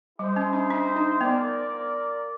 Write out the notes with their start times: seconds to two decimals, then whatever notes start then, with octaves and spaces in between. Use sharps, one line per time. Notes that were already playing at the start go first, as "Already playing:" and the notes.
0.19 G3 E4 G#4 C5 D#5
0.36 C#4
0.53 D4
0.70 D4
0.96 D#4
1.21 B3 F4 A#4 D5